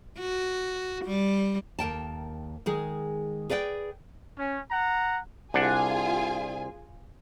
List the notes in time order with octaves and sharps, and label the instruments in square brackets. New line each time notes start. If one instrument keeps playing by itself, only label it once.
[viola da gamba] F#4
G3
[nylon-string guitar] D#2 A#4 G5 A5
D#3 G#3 G#4
G#4 B4 D5 F5 G5
[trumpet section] C#4
F#5 A#5
[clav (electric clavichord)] C2 D4 F#5 [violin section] F4 G#4 G#5